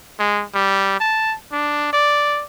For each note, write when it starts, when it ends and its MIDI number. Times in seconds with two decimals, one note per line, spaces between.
0.19 0.44 56
0.55 0.98 55
1.00 1.35 81
1.52 1.89 62
1.93 2.44 74